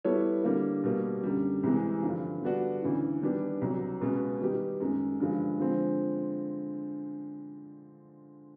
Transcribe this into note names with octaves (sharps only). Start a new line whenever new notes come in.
G3 B3 E4 A4 C#5
D3 G3 A#3
B2 G3 A#3
F#2 D3 G3
C2 C3 E3 G#3
G2 D3 F3
D3 G3 B3 D4 F#4
D2 C#3 E3
D#3 G3 B3 D4 G4
C2 B2 F#3
C#2 B2 G#3 B3
D#3 G3 B3 D#4 G4
F#2 D#3 G#3
G2 D3 F3 G#3
D3 F3 G#3 C4